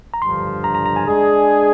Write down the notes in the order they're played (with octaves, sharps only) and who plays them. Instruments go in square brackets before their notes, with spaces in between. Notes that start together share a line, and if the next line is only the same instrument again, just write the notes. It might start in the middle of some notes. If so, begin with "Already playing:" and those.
[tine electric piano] A#5
[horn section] G2 D3 F3 [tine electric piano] C6
[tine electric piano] A#5
A#5
A#5
G#5
[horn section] G#3 D4 G#4